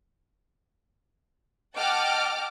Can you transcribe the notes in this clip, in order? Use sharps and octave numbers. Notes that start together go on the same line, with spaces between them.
D#5 F#5 G5 A5 D6 F6